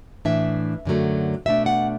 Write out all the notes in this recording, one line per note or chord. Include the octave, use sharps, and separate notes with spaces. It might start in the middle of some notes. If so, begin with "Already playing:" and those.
A2 E3 D4 E5
F#2 D3 F#3 A3
B2 A3 D4 E5
F#5